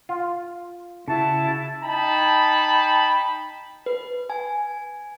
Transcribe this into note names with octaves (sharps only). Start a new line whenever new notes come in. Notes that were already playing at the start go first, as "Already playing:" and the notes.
F4
C#3 E4 F#4 A5
D#4 G5 A5 B5
B4
G#5